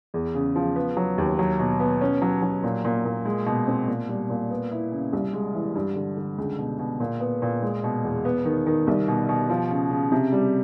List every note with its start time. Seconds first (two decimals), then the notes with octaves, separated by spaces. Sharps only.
0.14 E2
0.34 C#3
0.56 F3
0.76 B3
0.97 F#3
1.18 D#2
1.39 F#3
1.59 B2
1.80 B3
2.01 C#4
2.22 F#3
2.42 F#3
2.64 A#2
2.85 A#2
3.05 A#2
3.25 G#3
3.46 B2
3.67 C4
3.88 A#2
4.09 G3
4.30 A#2
4.51 B3
4.71 E4
4.92 C#3
5.13 C2
5.33 G#3
5.54 E3
5.75 G2
5.96 D3
6.17 D3
6.38 C#2
6.58 B2
6.79 B2
7.00 A#2
7.20 B3
7.42 A#2
7.62 G#3
7.84 B2
8.04 E2
8.25 B3
8.45 D#3
8.66 D#3
8.87 C2
9.08 B2
9.29 B2
9.50 F3
9.70 C#3
9.90 C#3
10.12 C3
10.33 G3